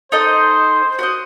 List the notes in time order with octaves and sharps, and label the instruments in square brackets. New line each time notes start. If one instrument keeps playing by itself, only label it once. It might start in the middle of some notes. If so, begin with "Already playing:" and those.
[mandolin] D#4 A4 D#5 [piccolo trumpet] C5
[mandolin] F#4 C5 D#5